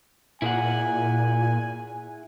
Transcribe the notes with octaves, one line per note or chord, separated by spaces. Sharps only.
A#2 E4 G#4 F#5 G#5